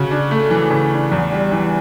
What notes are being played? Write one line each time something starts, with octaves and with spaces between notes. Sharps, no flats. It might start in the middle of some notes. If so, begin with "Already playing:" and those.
Already playing: C#3 F#4
D4
A3
E3
C#3
D4
E2
G3
E3